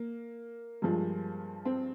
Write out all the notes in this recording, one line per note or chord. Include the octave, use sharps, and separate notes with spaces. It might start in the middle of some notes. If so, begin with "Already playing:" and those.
Already playing: A#3
G2 F3 G#3
C4